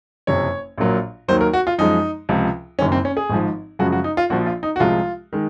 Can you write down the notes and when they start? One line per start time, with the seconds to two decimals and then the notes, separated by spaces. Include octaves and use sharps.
0.27 F#1 F2 C3 C#5
0.78 A#1 A#2 F#3 A#3
1.28 D#2 D#3 F#3 A#3 C5
1.41 A#4
1.53 F#4
1.67 F4
1.78 F#2 F3 G#3 D#4
2.29 C#2 C3 F3
2.79 F#1 F#2 D#3 C#4
2.92 C4
3.05 C#4
3.17 G#4
3.30 G#1 G#2 F3
3.79 F#2 C#3 F3 G#3 F#4
3.92 F#4
4.04 D#4
4.17 F4
4.30 A#1 A#2 F3 F#4
4.46 F4
4.63 D#4
4.76 F#4
4.80 C2 C3 F3 G#3 F4
5.33 D#3 G#3